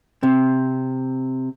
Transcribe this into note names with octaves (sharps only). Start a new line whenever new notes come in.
C3